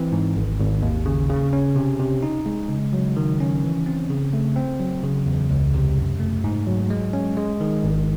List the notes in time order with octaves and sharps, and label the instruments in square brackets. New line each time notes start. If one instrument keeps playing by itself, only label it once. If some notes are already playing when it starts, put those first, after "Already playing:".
Already playing: [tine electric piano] E3 C4
G#2
G#1
G#1
D#2
C#3
C#3
C#4
C3
C3
D#4
G#3
C#3
F#3
D#3
C#4
E3
C4
C#3
A3
C4
F#3
C#3
E2
C#2
C3
F#2
A3
G#2
F#3
G#3
C#4
G#3
D#3
G#1